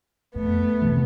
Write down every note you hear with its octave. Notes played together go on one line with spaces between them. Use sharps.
F2 A3 B3
C3 E3